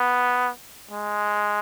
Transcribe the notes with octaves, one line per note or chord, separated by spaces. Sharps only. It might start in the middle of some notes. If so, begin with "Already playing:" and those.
Already playing: B3
G#3